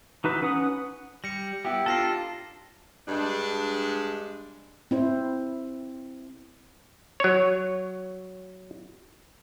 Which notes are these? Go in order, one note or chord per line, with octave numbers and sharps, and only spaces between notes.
E3 D#4 F#4 B4
C#4 B4 F#5 D#6
G3 A#6 C#7
B3 E4 G4
D4 D#4 F4 A4 A5 A#6 C7
G2 G#3 D4
C4 E4 C5
F#3 C#5